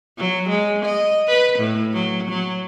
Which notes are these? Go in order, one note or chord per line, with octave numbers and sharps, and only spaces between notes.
F#3
G#3
D#5
B4
A2
F#3
F#3